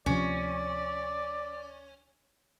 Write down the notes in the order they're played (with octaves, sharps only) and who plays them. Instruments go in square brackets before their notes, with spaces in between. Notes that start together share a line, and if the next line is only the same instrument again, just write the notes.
[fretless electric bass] D2 C3 F3 [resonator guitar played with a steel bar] C#4 [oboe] D5